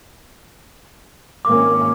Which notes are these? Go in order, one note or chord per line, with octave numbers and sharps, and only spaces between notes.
G#1 A#3 C#4 D6